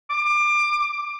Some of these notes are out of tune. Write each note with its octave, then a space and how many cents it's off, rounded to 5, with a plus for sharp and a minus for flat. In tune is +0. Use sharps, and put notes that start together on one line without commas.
D6 +25